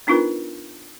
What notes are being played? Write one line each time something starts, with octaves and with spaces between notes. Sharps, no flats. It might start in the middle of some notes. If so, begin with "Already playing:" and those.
B3 D4 D#4 F4 A#4 B4